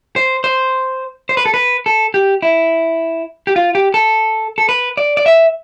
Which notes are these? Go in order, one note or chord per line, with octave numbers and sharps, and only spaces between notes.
C5
C5
C5
B4
A4
B4
A4
G4
E4
G4
F4
G4
A4
A4
B4
D5
D5
E5